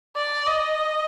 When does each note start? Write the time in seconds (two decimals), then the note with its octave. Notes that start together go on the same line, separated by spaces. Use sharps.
0.16 D5
0.47 D#5